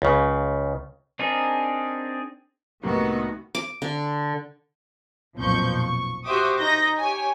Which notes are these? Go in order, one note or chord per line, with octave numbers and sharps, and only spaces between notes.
C#2 C#3
C4 D4 D#4 G#4 A#4
C2 A2 D#3 A#3 B3 F#4
D6
D3
B1 F2 A#2 F3 C#6 G6
C#6
F#4 G4 C5 E5 D6 D#6
D#4 G6 A#6
G4 C#5 G#5